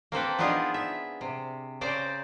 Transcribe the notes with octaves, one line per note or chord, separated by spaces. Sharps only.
A#3 C4 A4 B4
B3 D4 D#4 F4 G#4
E5
C3
C#3 C5 D5 A#5